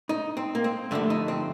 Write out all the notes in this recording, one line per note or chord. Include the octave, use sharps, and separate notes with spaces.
D#4
C4
A#3
C4
G2 D3 F3 A3 D4
D#4
C4